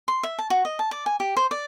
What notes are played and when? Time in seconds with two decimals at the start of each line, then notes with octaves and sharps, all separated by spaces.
0.08 C6
0.23 E5
0.39 A5
0.50 F#4
0.65 D#5
0.79 A5
0.91 D5
1.06 G#5
1.20 G4
1.37 C5
1.51 D5